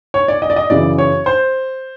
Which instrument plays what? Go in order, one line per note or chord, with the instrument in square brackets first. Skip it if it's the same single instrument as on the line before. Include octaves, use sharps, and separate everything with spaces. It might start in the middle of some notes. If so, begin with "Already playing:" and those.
[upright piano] C#5
D5
D#5
D5
D#5
F#2 C#3 E3 D5
C#5
C5